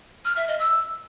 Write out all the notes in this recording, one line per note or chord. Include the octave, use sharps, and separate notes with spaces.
F6
E5
D#5
E6